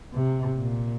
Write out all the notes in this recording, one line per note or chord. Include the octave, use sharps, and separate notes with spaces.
C3
A#2